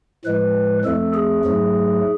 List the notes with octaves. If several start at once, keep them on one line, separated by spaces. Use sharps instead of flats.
A2 F3 G#3 B4
F2 F3 A3 A4
G#4
G#2 F#3 A3